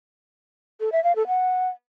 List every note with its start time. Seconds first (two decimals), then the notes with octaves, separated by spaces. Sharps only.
0.80 A4
0.92 E5
1.04 F5
1.16 A4
1.27 F#5